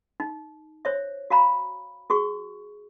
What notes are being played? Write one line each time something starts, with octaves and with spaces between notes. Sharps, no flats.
D#4
C5 C#5 E5
F#4 F5 A#5 B5
F#4 G#4 C#6